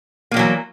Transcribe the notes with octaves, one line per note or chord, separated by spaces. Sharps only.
D#3 E3 F#3 A#3